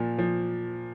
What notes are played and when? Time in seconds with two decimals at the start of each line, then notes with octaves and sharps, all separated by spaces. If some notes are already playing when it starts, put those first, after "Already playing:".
Already playing: A#2 F3
0.19 F3